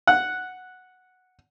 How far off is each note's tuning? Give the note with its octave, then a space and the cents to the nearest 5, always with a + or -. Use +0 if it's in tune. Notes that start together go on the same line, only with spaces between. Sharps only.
F#5 -5